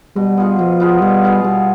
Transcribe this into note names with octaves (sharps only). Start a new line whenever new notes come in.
B2 G3
B3 F4 G#4
B2 F3
B3 F4 G#4
B2 G3
B3 F4 G#4
B2 G3